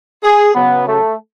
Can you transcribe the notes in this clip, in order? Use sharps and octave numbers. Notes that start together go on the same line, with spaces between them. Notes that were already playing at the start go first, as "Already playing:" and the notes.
G#4
C#3 F#3 B3
A3